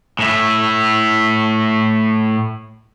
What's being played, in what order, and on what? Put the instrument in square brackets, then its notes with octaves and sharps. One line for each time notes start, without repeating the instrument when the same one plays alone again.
[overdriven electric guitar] A2 E4